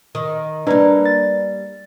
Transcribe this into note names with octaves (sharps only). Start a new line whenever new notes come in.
D#3
G3 A#3 D4 B4 A#5
A6